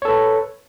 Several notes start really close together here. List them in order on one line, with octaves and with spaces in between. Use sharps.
C#5 A4 B4